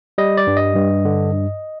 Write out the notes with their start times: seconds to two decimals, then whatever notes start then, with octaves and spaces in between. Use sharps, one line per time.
0.18 G3 D#5
0.37 D5
0.47 G2
0.57 D#5
0.75 G2
1.05 D3